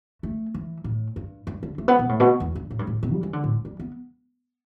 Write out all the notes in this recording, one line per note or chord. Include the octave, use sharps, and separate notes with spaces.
A3
E3
A2
G2
G2
D3
A3
B3
B2
A2
B2
E2
G2
A2
G2
A2
B2
G3
E3
D3
A2
G2
G3
B3